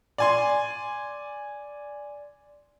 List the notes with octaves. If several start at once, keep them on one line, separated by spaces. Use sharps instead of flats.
D5 G#5 C6